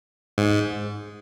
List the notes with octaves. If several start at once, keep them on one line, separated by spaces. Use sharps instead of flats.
G#2